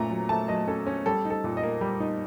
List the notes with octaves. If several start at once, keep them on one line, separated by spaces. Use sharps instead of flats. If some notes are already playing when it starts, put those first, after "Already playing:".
Already playing: A#2 A3 C#4 A#5
F#3
A3 A5
F#3 D#5
C#4 A4
C#4
G3 A4
D#4
A4
A#2
D#5
A#3
G3
D#4